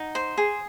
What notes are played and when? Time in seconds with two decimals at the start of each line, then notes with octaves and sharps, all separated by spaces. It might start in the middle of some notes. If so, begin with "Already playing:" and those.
Already playing: D#4 F#5
0.15 C5
0.38 G#4